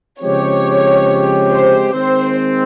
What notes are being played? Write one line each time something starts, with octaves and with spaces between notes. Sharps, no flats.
C#3 F3 G#3 C4 G4 C#5
C5
D#3 G#3 C4 C5